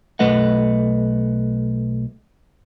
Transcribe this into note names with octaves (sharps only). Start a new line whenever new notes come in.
B1 A3 B4 D#5 F#5